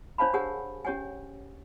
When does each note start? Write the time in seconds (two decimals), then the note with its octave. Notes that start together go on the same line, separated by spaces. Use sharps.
0.18 D4 C5 C#5 F5 A5 B5
0.34 G4 G#4 A#4 C#5 F#5 G#5
0.85 C#4 G4 C#5 F#5 G#5